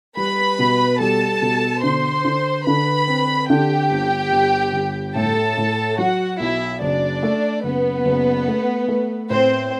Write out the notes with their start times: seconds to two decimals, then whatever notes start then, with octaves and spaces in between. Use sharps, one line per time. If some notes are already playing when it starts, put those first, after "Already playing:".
0.17 G3 B4 B5
0.59 B2
1.00 G3 A4 A5
1.42 B2
1.83 D3 C5 C6
2.25 D3
2.66 D3 B4 B5
3.08 C4
3.49 D3 G4 G5
3.91 G1
4.32 G1
4.73 G1
5.15 A2 A4 A5
5.57 A2
5.98 F#3 F#4 F#5
6.40 B1 E4 E5
6.81 F#1 D4 D5
7.23 A3
7.64 F#1 B3 B4
8.05 F#1
8.48 A3
8.88 A3
9.30 A2 C4 C5